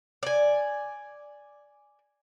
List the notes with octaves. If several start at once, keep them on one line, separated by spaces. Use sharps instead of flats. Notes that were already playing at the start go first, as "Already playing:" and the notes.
D5 G#5